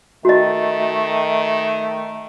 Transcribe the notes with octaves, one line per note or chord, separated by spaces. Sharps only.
D#3 A3 F#4 D#5